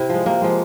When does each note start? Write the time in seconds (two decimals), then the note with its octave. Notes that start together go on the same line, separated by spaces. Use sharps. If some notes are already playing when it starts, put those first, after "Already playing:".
Already playing: C3 E4
0.09 F3 G#3
0.26 C3 A#3
0.42 F3 G#3